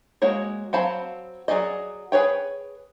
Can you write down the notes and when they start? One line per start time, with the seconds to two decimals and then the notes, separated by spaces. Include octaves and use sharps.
0.22 G#3 A#3 F#4 C#5
0.73 F#3 C4 F5 A5 B5
1.48 F#3 E4 G#4 D5 D#5
2.12 G#4 B4 C#5 G5